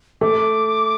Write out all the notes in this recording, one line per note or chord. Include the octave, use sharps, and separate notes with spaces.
A3 D6